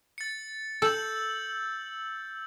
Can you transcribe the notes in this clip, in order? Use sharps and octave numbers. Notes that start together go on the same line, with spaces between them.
A6 C#7
A4 E6 G6 F#7